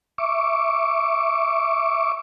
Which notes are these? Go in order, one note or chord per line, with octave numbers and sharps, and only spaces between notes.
E5 C#6 D6